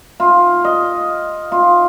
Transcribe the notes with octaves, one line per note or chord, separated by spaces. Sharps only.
F4
D#5
F4